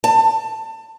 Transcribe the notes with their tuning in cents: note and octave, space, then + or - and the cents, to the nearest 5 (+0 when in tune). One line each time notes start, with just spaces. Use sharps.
A5 +25